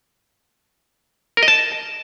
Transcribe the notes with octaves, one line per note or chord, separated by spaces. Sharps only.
A#4
D#5
A5